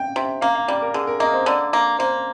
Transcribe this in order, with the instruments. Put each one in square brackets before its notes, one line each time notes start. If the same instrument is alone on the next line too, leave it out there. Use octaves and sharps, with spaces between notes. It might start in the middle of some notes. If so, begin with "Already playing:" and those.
Already playing: [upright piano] G5
[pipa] C3
[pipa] A#3 [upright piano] F5
[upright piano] F5
[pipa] G3 [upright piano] D5
[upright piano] A#4
[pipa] D3 [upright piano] G#4
[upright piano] A#4
[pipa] A#3 [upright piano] D#5
[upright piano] C5
[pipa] D3 [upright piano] D5
[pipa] A#3
[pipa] A#3 [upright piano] C5